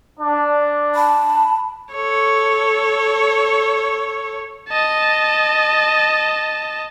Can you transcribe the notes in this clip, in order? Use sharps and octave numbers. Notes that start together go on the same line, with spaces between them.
D4
A5 B5
A4 C#5
D#5 A5